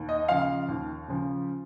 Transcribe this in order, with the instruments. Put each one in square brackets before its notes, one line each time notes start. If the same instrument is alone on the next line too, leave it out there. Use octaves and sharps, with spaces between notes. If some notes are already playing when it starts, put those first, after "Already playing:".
Already playing: [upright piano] D#2
D#5
C#3 F3 F5
D#2
C#3 F3